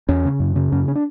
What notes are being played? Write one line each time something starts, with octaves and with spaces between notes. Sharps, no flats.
E2 C#4
C#3
F#2
C#3
F#2 C#4
C#4
D4